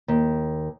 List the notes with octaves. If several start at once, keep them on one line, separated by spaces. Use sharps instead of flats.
D#2